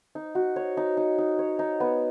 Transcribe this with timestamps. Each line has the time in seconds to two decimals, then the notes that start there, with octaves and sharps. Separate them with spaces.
0.15 D#4
0.35 F#4
0.56 C#5
0.77 D#4
0.97 D#4
1.18 D#4
1.39 C#5
1.59 D#4
1.80 B3